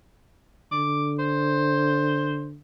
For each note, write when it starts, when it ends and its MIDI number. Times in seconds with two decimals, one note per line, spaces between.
0.72 2.59 50
0.72 1.12 86
1.19 2.46 72